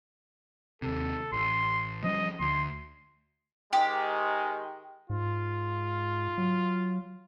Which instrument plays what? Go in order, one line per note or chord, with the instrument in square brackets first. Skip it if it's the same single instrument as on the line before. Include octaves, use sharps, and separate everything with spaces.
[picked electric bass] D#2 C3 [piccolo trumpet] A4
[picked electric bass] A1 [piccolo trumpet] C6
[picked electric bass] F3 G3 C#4 [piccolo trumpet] D#5
[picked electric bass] D2 [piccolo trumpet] C6
[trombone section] G#2 D#3 G#3 [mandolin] G4
[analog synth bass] G#2 [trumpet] F4
[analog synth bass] F#3